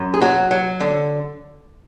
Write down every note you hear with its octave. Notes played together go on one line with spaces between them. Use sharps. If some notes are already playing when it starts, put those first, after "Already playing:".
Already playing: F#2
G#4
F#3 F#4
F#3
D3